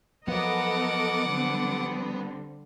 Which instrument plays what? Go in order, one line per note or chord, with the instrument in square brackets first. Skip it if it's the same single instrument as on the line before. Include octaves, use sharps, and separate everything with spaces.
[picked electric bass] F3 F#3 [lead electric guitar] B3 [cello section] A4 A#4 D#5 [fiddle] F#5 D6
[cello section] D3 G3 C4